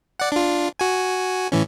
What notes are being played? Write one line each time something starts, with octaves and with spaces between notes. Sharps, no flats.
D5 F#5
D4 F4
F#4 G#5
A2 E3 C#4